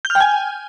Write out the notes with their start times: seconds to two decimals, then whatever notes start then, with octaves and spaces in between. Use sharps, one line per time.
0.05 G6
0.10 F6
0.15 G5
0.20 G#5